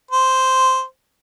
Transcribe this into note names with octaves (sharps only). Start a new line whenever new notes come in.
C5